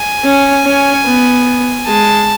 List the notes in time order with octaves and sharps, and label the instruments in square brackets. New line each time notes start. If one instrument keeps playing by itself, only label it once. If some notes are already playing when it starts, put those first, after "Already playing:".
Already playing: [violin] G#5
[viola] C#4
C#4
B3
[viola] G#3 [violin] A5